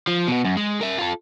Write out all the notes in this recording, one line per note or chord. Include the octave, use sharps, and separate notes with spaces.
F3
B2 B3
F#2
G#3
A#4 E5
F4 A4